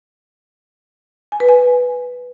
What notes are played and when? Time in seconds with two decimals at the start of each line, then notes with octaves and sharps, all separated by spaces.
1.32 G#5
1.40 B4
1.49 G#5